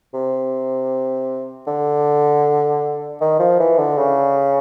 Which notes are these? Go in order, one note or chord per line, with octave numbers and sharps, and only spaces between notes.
C3
D3
D#3
F3
E3
D3
C#3